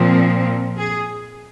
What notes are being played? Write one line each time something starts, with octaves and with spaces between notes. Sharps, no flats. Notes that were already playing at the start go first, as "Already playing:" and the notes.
Already playing: A#2 F3 C4
G#4